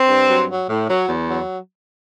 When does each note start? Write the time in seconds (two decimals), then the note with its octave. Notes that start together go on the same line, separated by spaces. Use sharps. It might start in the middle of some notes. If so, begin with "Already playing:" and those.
Already playing: C4
0.08 G2
0.29 F#3
0.49 F#3
0.69 A2
0.88 F#3
1.07 E2
1.27 F#3